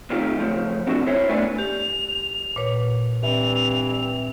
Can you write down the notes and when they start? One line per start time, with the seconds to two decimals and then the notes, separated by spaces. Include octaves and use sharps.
0.10 G#2 C3 D#3 A3 F4 G4
0.39 C#3 E3 F3 A3
0.87 E3 C4 D4 F#4 A4
1.07 E4 A#4 C5 C#5 E5
1.29 A3 B3 D4 E4 D5 G#5
1.58 G4 F7
2.56 A#2 B4 C#5
3.23 G2 E3 C4 F7